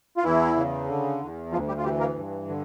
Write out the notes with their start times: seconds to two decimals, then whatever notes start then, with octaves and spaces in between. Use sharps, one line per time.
0.17 F4
0.24 E2 E3 E4
0.56 C#3
0.88 D3
1.20 E2
1.52 D2 F3 F4
1.68 G3 G4
1.77 F4
1.84 E3 G3 G4
2.00 A#3 A#4
2.16 G2
2.48 D3